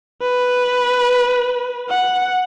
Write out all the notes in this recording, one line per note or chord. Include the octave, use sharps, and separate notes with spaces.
B4
F#5